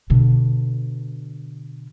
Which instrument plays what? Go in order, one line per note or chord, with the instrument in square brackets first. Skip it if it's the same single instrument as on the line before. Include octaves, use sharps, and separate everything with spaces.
[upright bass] B2 D3